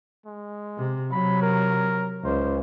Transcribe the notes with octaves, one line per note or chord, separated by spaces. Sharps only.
G#3
C3
C3 F#3 B5
A#4
C#2 C5